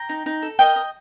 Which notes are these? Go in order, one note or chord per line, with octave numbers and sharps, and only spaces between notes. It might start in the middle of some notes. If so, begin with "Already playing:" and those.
Already playing: G5 A#5
D#4
D#4
A4
A#4 D#5 G5
D#5